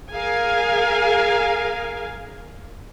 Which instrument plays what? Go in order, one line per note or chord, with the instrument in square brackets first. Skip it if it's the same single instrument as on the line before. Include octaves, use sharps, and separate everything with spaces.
[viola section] G#4 A#4 F5 G#5